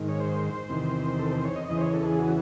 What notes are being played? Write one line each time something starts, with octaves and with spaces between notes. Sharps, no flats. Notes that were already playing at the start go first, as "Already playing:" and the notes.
Already playing: G#2 D#3
C#5
C5
E2 C3 D#3
A4
C5
C#5
D#5
E2 C#3 E3 D#5
C5
C#5
A4
G#4
F#4